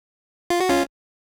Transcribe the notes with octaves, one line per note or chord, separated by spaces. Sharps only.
F4
F#4
C#4 F4